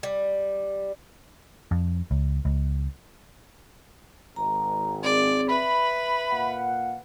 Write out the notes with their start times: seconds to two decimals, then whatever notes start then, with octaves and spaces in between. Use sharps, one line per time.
0.03 G3
1.71 F2
2.11 C#2
2.45 C#2
4.36 G#1 A#5
5.03 C4 G#4 D5
5.49 B4 E5 B5
6.32 A#2 F5 F#5